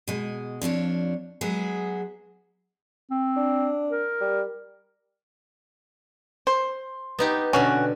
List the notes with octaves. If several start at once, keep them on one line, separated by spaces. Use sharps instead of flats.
B2 G#3
F2 F3 D4 C#5
F#3 G#3 B3 G#4
C4
D4
A#4
G3
C5
B3 D#4 G4
B2 D3 C#4 F#4